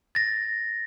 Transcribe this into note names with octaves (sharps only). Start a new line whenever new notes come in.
A6 A#6